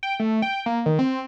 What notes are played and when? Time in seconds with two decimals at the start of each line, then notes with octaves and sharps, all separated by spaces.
0.03 G5
0.20 A3
0.42 G5
0.66 A#3
0.86 D#3
0.99 C4